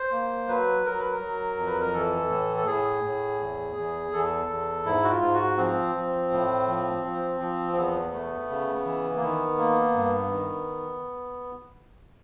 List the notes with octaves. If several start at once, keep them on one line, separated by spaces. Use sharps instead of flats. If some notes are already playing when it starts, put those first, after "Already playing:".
Already playing: C5
A#3
F#3 B4
F#3 A#4
B4
A#4
F#3
F2
B4
A#4
E3 A4
A2
A4
A2 G#4
A2
E2
E2
E2 A4
E2
G#2 E4
F#4
F4
G#2
F#4
F3 C4
F3
A2
F3
F3
F3
C4
E2 B3
A3
C#3
E3
A#3
D#3 B3
A#3
G2
D#3